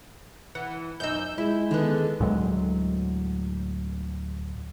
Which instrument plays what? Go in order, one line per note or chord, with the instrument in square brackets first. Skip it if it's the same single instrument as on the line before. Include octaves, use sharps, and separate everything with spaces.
[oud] E3 [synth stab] F#5
[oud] F#2 D#4 [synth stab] E6 G6
[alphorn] G#3 [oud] E4
[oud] D3 B3 [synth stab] D#3
[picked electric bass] D2 A2 F#3 G#3